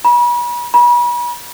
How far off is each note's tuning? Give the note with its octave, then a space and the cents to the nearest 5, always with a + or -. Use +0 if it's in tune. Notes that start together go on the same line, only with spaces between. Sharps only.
B5 -40
B5 -40